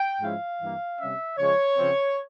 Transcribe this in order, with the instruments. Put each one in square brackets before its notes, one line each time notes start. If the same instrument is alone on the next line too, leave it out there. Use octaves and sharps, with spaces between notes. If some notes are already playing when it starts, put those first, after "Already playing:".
Already playing: [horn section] G5
G#2 F3 G#3 C#4 E4 F5
G2 E3 G3 A#3
C3 G3 C#4 E5
C#3 F3 G#3 C#5
C#3 F3 C4